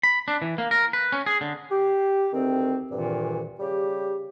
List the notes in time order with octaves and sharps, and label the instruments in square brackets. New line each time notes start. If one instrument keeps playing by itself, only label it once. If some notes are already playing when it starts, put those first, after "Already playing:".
[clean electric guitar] B5
D4
E3
A#3
A#4
B4
C#4
G#4
D3
[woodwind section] G4
D2 D#3 C4
D2 G2 A#2 D#3 E3
C#3 G3 G4